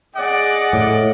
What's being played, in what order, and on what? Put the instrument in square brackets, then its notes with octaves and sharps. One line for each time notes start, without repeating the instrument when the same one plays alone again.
[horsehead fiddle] G#4 D5 [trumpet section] D#5 F#5 D6
[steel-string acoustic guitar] A2